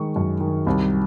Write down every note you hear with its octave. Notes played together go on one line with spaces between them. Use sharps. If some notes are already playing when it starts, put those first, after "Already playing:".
Already playing: D#3 G#3 C#6
F#2
D#3
C2